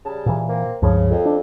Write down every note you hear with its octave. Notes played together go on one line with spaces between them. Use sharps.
C#3 G3 A5
A#2 E3
A#3 C4
C#2 G2 C#3 F3
F2
D4